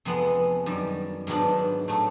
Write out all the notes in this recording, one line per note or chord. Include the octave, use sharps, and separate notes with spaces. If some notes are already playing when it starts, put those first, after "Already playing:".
F2 C3 F3 G#3 B3
F#2 D#3 G3
G#2 D#3 F#3 B3 D4
A2 F#3 A3